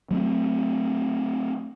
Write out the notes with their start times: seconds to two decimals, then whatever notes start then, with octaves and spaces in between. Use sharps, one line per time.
0.11 F#3 A3 B3 C4